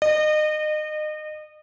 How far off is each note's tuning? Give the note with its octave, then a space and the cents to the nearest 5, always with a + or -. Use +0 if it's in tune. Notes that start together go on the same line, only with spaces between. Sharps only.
D#5 -35